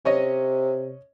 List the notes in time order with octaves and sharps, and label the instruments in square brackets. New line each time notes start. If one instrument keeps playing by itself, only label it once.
[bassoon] C3 [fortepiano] C#4 C#5 D#5